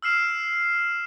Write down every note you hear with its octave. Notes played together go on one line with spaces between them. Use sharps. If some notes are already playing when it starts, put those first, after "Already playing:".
E6 F6 C7 E7